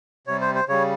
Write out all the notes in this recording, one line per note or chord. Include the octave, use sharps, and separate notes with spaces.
C3 G3 C#5
C5
C5
C#3 G3 C#5